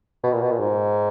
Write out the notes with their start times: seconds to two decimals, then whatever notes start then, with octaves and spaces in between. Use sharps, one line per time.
0.24 B2
0.33 A#2
0.42 B2
0.51 A#2
0.60 G#2